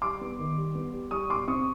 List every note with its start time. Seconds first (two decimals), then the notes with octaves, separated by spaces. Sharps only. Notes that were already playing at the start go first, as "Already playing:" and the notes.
0.02 G3 C6 D6
0.21 B3
0.39 D#3
0.57 G3
0.75 B3
0.93 G3
1.11 G3 C#6 D#6
1.29 B2 C6 D6
1.47 C4 C#6 D#6